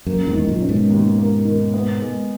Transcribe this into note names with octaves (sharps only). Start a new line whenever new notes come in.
F#2 A#3
E2 G#2
D#3
F#2 A#2
C#4
G#2 B2
D#2
A#3
D#3
B3
G#3